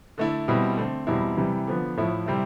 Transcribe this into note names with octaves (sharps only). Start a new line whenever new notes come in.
D3 A3 E4
B2 G3 C4 E4
D3 A3 C4
E2 B2 G3 C4 E4
C3 E3 G3
D3 F3 B3
A2 F3 A3 E4
C3 G3 C4 E4